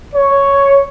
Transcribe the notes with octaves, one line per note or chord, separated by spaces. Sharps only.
C#5